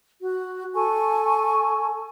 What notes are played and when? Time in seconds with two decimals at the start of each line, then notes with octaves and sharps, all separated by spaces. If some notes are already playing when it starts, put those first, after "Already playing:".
0.22 F#4
0.73 A4 G#5 C#6